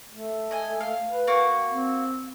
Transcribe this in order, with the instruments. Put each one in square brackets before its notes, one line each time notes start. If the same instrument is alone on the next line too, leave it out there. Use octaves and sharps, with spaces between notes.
[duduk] A3
[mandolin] D#5 G#5
F5
[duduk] B4
[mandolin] A#3 F#4
[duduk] C4